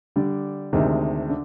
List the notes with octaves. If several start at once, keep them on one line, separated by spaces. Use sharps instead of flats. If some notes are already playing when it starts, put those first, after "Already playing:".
D3 G3 D4
D2 C3 D#3 G#3
D3